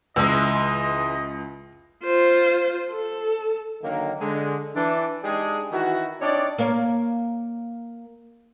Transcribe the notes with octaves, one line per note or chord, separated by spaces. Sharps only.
C#2 E3 G#3 D#5 E6
F4 C5
A4
D3 D#3 F#3 A#3
D3 G#3
E3 D4
G#3 D4 D#4 G4 G#4
D#3 E3 E4 F#4
C4 D4 D#4 C#5 D5
A#3 A#4 C#5